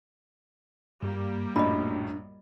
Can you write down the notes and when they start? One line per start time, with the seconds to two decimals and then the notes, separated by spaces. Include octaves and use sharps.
1.03 G2 G3 A#3
1.56 A#1 F#2 A2 D4 D#5 A#5 B5